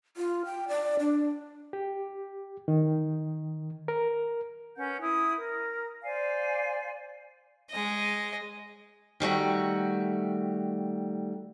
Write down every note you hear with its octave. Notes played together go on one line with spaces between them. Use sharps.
F4
G5
D5
D4
G4
D#3
A#4
C#4 B4 F#5 G6
E4 D#6
A#4
C5 D5 F5 G#5
G#3 D#5
D#3 G3 A3 F#4